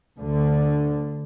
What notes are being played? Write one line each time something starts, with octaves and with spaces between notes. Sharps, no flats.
D2 D3